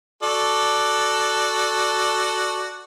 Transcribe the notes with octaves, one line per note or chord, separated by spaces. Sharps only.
F#4 A4 D5